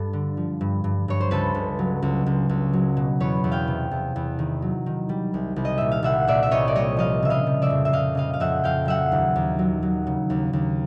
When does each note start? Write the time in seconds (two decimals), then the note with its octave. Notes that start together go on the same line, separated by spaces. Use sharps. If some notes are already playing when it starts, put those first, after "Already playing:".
Already playing: G2 A4
0.13 D3
0.37 F3
0.61 G2
0.84 G2
1.08 G2 C#5
1.20 C5
1.31 C#2 A4 B4
1.55 C#2
1.79 F#3
2.02 C#2
2.26 C#2
2.49 C#2
2.73 F#3
2.97 B2
3.20 E2 B4 C#5
3.44 E2
3.52 F5 G5
3.68 C3
3.91 E2
4.16 E2
4.39 D#3
4.62 F#3
4.86 D#3
5.09 G3
5.34 C2
5.56 C2
5.65 D#5
5.78 A#2 E5
5.91 F5
6.03 C2 E5 F#5
6.27 A#2 D5 E5
6.43 E5
6.51 C2 C#5 D#5
6.68 D5
6.75 G3 C#5 D#5
6.97 F3 D#5 F5
7.22 C#3 E5
7.30 D#5 F5
7.47 F3
7.62 D5 E5
7.70 F2
7.85 E5
7.93 F2 D#5 F5
8.15 C#3 D#5 F5
8.34 F5
8.40 F2 E5 F#5
8.64 F2 F5 G5
8.85 F#3 E5 F#5
9.12 D#2
9.36 D#2
9.59 F#3
9.83 F#3
10.07 C#3
10.30 D#2
10.53 D#2